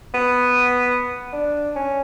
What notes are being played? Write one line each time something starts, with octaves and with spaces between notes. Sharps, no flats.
B3
D4
C#4